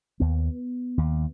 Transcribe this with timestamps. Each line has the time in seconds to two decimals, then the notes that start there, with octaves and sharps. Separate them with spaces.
0.20 D#2 B3
0.98 D#2